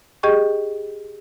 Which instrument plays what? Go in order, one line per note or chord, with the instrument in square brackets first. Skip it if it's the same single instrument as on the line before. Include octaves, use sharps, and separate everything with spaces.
[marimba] G4 G#4 D#5 G5 C#6